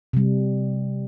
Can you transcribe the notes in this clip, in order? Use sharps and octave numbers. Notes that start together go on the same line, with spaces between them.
C3 G3